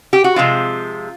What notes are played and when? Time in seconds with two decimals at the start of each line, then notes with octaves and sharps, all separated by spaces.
0.13 G4
0.24 F#4
0.36 C3 F3 G#3 C4 F4